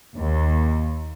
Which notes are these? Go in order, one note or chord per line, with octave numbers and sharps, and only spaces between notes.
D#2